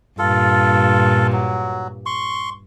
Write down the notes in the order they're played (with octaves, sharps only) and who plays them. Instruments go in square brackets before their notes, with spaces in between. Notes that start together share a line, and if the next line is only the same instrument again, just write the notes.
[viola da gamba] G2 A#2 [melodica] F4 A4
[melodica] F#3
C6 C#6